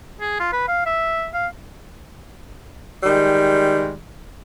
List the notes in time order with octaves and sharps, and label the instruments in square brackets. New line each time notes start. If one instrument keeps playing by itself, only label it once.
[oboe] G#4
F4
B4
F5
E5
F5
[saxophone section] D#3 G3 G#3